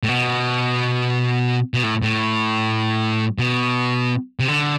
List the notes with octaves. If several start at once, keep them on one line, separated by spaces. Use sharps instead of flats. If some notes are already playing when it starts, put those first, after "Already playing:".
A2
B2
B2
A2
A2
B2
C3
D3